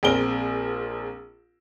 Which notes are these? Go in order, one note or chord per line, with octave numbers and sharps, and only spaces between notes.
A#1 C4 G#4 A#4 D7 G7